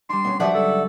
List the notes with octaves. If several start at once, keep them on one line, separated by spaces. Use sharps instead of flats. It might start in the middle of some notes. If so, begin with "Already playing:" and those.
G3 D4 C6
B3 C#4
F3 F#3 G4 B4 D5 E5 F#5
C#2 A4